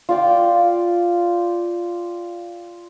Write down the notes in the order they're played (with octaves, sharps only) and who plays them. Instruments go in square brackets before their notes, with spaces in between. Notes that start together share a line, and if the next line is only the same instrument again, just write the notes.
[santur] F4 D5 G5